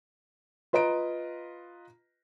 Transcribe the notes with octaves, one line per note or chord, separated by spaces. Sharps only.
F4 B4 D#5 A#5 D7